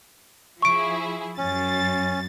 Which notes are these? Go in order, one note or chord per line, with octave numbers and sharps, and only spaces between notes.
F3 E4 G#4 C#6 D7
F#2 C#4 A6